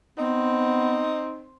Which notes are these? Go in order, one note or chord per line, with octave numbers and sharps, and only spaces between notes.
B3 C4 D#4